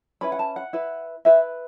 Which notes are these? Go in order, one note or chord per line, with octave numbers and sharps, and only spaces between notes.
C#4 E4 B4 B5
F#5
A5
F#5
E4 B4
E4 B4 E5